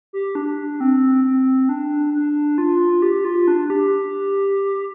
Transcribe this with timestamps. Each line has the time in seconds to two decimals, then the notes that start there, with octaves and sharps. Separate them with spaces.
0.13 G4
0.35 D4
0.80 C4
1.24 C4
1.69 D4
2.14 D4
2.58 F4
3.02 G4
3.25 F4
3.48 D4
3.70 G4